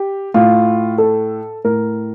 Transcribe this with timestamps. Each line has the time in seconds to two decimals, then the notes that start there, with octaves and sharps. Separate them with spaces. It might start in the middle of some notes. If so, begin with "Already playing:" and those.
Already playing: G4
0.34 A2 F4
0.98 A4
1.64 A2 A#4